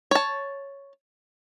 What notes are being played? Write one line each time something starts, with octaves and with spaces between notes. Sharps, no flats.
C#5 A5